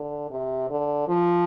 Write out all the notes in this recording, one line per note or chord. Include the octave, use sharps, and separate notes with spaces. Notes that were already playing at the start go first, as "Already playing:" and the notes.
Already playing: D3
C3
D3
F3